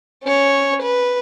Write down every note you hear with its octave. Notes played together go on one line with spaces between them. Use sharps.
C#4 C#5
B4